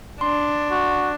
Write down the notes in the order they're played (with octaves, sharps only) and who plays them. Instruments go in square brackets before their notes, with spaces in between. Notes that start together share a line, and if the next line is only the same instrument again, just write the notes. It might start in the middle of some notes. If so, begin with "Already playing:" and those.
[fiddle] D4 [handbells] C6
[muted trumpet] F#4